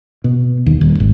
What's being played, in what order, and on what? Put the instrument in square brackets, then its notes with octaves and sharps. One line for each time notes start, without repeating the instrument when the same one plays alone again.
[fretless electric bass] B2
D#2
D#1
G#1